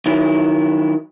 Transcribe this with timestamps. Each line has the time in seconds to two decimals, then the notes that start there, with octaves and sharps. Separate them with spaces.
0.06 D#3 F#3 E4